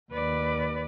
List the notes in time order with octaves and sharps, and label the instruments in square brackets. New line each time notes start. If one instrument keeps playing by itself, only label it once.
[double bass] D#2 [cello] B4 D5